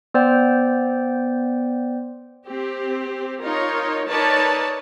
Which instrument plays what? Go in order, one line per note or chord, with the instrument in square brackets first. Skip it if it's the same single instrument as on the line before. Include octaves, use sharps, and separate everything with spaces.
[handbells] B3 C5 D5 G5
[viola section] C4 G4
D#4 F4 A#4 C#5
D#4 A#4 B4 C#5 D5 A5